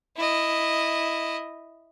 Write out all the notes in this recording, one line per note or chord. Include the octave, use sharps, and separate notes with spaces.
E4 D#5